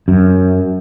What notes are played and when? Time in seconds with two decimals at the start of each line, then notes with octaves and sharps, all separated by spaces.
0.08 F#2